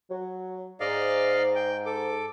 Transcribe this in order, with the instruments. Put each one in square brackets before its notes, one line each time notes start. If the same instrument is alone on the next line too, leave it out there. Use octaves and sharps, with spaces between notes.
[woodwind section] F#3
[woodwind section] G#2 [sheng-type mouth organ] D5 D#5 F5
[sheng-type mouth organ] G5
A4 D6